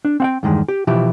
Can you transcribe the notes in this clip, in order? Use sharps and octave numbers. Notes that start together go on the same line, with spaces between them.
D4
C4 F#5 G5
E2 G2 D#3 G#3
G4
B2 E3 F3 E4 G4